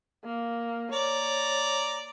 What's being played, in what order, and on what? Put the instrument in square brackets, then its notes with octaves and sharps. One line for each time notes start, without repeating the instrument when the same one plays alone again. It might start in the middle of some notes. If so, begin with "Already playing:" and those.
[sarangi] A#3
[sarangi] C#5 [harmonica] D5 A#5